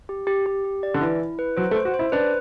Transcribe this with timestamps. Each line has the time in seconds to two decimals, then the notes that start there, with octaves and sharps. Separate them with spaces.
0.09 G4
0.27 G4
0.46 G4
0.64 G4
0.83 D5
0.94 D3
1.01 E3 E4
1.20 E4
1.39 B4
1.57 F#3 C5
1.71 A3
1.75 C5
1.85 F#4
1.94 C5
1.99 E4
2.12 D4 B4